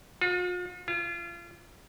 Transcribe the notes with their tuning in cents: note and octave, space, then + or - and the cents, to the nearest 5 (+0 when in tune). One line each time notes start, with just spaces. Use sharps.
F4 +45
F4 -30